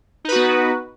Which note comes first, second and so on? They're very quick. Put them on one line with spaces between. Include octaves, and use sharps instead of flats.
D#4 B4 F#4 B3